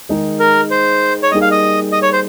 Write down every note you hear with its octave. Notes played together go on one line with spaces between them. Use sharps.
D#3 G#3 D#4 G#4
A#4
C5
C#5
G3 A#3 D#4 G#4 D#5
F5
D#5
D#5
C#5
C5